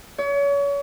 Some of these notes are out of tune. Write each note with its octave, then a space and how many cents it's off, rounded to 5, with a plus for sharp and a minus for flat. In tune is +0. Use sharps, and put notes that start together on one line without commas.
C#5 +35